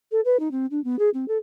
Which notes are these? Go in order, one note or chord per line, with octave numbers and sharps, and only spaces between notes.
A4
B4
D#4
C4
D4
B3
G#4
C4
A4